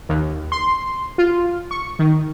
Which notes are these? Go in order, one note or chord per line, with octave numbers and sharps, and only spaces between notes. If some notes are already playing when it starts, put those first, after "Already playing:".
D#2
C6
F4
C#6
D#3